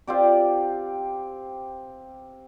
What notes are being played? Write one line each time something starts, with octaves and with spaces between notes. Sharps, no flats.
C4 F4 G4 D5